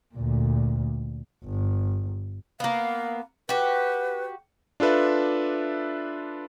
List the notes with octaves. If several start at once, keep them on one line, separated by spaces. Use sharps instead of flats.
D2 A#2
G1
A#3 B3 F5
F#4 G4 B4
D4 F4 A4 B4 E5